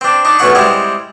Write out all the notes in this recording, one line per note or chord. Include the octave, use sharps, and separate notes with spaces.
C4 D4
D4 D#4
E2 B2 A3 C#4 F#5 C#6
G3 G#3 C4 E4 G#4